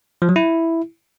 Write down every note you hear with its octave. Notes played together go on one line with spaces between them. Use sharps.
F3
F#3
E4